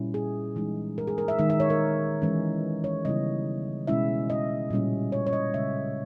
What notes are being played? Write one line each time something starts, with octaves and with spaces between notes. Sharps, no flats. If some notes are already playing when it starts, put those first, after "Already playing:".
Already playing: A#2 G3 C#4 E4
G#4
E3 G#3 D#4
A#4
G#4
A#4
E5
D#3 G#3 D#4 E5
E5
C#5
A#4
E3 G#3 C#4
C#5
C#3 G3 B3 E4 D#5
B2 G#3 C#4 E4 E5
D#5
A#2 G3 C#4
C#5
C#5
D#5
C#3 G#3 C#4 E5